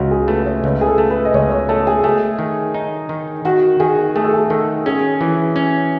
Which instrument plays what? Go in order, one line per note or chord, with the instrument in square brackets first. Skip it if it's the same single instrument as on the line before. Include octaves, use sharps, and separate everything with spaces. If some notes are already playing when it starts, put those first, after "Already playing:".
Already playing: [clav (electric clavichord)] C#2 [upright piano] F#4
[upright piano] G#4
[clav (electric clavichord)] A3 [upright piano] B4
[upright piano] C#5
[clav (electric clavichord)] C#2 [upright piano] B4
[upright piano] G#4
A4
[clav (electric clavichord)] A3
[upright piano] B4
D#5
[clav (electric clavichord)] C#2 [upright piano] C#5
[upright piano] C#5
[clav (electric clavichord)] A3 [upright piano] A4
[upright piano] G#4
[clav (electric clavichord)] A3 [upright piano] G#4
[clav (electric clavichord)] D#3
D#4
D#3
[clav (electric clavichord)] D#3 [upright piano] F#4
[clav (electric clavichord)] D#3 [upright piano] G#4
[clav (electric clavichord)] A3 [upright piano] G#4
[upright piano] A4
G#4
[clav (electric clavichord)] D#3 [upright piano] A4
[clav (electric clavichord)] C#4 [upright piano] G#4
[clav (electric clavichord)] E3
C#4